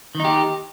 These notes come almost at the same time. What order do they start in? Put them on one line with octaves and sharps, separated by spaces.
D#3 D#4 G4